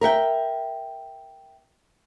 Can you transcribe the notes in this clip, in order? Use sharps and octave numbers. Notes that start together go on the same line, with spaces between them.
A#4 E5 F#5 G5